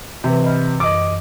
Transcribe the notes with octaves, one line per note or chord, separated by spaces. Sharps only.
C3 E3 B4
D#5 B5 F6
F#2 D#5 D6